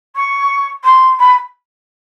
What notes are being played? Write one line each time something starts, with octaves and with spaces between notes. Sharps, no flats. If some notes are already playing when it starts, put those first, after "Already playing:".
C#6
C6
B5